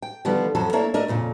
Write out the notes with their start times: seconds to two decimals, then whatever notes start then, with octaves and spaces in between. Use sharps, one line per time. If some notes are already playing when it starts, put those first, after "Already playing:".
0.02 G5
0.25 D3 D#3 F3 G3 B3
0.55 F2 F3 F#3 A4
0.73 A3 A#3 D4 E4 C#5
0.94 A3 D4 A#4 D#5
1.08 F2 A#2 C#3